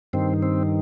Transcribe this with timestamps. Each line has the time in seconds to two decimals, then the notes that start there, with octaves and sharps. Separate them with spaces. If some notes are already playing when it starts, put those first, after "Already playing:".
0.13 G2 D#3 C4
0.43 C4